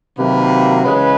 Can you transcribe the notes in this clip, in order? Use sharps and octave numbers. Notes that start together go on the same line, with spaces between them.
C3 D#3 F#3 A#3 B4
C#3 E3 G#3 B4